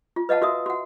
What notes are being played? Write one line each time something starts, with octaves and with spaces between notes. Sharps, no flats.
F4
B4 D#5 F5 F#5 A5
F#4 A#4 E5 D#6
F#4 F#5